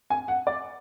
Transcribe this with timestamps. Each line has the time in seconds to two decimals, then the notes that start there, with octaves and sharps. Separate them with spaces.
0.10 G#5
0.28 F#5
0.47 D5